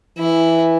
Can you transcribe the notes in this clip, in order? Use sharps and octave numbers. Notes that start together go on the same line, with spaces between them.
E3 E4